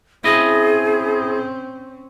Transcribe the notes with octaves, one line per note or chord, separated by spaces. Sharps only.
C4 C#4 E4 G#4 D#5